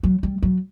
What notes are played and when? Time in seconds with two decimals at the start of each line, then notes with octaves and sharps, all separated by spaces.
0.03 F#3
0.23 G3
0.42 F#3